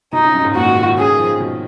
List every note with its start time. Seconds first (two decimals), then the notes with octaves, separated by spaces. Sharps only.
0.12 B2 D#4
0.24 C#3
0.34 F#2
0.44 G#2
0.55 A#2 F#4
0.66 D#3
0.76 C#3
0.98 C#3 G#4
1.08 D#3
1.19 F3
1.30 D#3
1.40 B2